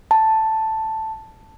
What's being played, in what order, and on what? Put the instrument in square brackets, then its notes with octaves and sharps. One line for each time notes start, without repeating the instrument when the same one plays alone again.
[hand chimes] A5